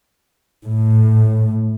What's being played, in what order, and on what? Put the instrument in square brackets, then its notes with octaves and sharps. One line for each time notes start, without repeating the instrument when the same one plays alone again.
[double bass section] A2